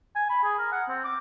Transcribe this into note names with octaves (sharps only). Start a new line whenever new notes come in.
G#5
B5
G#4
A#4
F#5
C4
D6